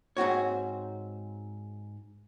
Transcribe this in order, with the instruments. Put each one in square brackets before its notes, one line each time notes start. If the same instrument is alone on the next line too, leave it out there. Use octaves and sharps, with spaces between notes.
[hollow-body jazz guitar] G#2 C4 F#4 C#5